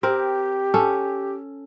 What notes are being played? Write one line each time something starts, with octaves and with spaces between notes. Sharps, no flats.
C4 G4 A#4
C#4 A4